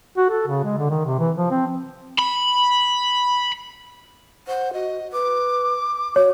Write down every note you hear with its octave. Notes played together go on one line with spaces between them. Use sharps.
F#4
A4
C#3
G#3
D3
D#3
C3
E3
F3
C4
B5
C5 F#5
F#4 D#5
B4 D6
F#4 C#5